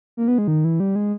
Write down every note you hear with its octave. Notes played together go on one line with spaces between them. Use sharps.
A#3
B3
G#3
D#3
E3
G3
G#3